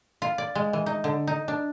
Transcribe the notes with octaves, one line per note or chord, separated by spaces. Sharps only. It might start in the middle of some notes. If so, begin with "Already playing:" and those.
F4
D5
G#3
E3
D#4
D3
D#4
D4